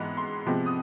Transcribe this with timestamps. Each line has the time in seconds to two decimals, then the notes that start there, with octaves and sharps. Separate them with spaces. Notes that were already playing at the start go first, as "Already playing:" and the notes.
Already playing: G#2 E3 G#3 B3 B5
0.17 C6
0.46 C3 F3 G#3 B3
0.66 D#6